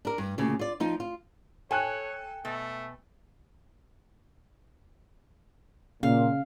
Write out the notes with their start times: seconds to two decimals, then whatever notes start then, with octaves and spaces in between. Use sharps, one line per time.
0.05 D4 A#4
0.18 G2
0.38 D2 A#2 C#3
0.59 F4 D5
0.80 F3 D#4 F4
1.00 F4
1.71 A4 C#5 G5 G#5 F#6
2.45 B2 A3
6.03 A#2 C#3 F5